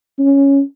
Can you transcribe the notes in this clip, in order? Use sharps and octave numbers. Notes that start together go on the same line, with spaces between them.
C#4